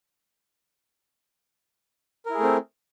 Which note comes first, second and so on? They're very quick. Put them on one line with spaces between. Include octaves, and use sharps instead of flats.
A#4 E4 G#4 A3 C4